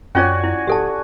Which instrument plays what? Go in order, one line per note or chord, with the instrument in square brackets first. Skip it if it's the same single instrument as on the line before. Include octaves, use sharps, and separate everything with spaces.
[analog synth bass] F#2 [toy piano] C#4 F4 C#5 [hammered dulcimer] F#4 D5 G#5
[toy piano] E4
[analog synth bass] D1 [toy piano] G4 A4 A5